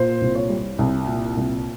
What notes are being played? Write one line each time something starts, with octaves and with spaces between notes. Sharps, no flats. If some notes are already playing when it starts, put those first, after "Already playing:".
Already playing: A#2 C5
C2
C#5
G3
C2
A#2
C2